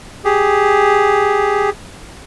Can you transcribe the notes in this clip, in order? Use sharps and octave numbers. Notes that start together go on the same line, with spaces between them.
G4 G#4